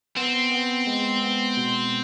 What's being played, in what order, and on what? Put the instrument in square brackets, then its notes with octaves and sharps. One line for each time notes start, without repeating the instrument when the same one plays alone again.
[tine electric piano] B3 [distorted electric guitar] C4
[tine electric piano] B3
G#3
B3
B2